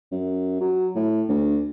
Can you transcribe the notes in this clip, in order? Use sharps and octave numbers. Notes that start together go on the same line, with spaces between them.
F#2
F#3
A2
D2